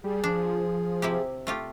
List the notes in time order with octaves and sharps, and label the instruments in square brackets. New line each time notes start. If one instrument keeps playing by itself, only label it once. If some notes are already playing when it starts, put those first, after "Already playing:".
[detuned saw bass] G3 [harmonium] G#4
[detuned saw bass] F3 [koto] D4
[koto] C3 E4 G4
A3 F4 G4